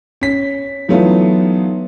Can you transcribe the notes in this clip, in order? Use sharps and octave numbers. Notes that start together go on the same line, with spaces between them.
C#4 B6
E3 F#3 A3 B3 D#4 F4